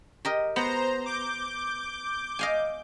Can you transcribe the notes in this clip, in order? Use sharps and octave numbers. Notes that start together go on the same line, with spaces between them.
G4 A#4 D#5
B3 C5 A#5
D6 G6
D#5 F5 G#5